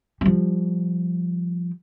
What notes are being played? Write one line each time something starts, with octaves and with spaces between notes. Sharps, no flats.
F3 G3